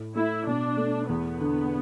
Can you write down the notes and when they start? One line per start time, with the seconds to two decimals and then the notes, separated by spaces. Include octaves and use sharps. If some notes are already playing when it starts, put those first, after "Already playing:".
Already playing: A2
0.15 A3 E4
0.47 B2 D4
0.77 A3
1.09 E2 B3
1.40 D3